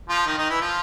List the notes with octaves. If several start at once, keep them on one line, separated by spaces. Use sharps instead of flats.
F3 F4
D#3 D#4
D#3 D#4
E3 E4
F3 F4